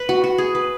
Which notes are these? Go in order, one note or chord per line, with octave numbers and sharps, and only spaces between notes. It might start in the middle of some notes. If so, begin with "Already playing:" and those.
Already playing: B4
F#4
F#4
G#4
B4